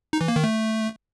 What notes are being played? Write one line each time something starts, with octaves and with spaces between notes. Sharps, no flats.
D#4
E3
A#3
D#3
A3